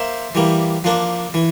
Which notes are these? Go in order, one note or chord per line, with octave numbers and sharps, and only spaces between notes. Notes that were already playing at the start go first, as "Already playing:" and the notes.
Already playing: A#3 C5 E5
E3 G3 A#3
F3 A#3 D4
E3